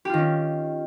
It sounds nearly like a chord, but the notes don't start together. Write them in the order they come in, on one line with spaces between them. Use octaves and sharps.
G4 F4 D#3 C#4